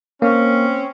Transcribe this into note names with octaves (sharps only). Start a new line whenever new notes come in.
A#3 C4 C#4